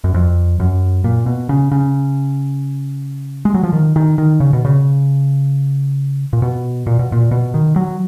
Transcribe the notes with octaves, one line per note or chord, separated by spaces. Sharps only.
F#2
F2
F#2
A#2
B2
C#3
C#3
G#3
F#3
F3
D#3
D#3
D#3
C#3
B2
C#3
A#2
B2
A#2
B2
A#2
B2
D#3
F#3